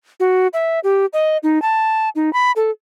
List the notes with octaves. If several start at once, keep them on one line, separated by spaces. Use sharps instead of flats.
F#4
E5
G4
D#5
D#4
A5
D#4
B5
A4